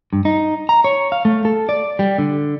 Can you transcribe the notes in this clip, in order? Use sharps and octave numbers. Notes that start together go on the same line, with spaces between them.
G2
D#4
A#5
C#5
F5
A3
A4
D5
G3
D3